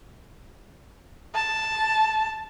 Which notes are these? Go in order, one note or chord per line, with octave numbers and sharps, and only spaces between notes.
A5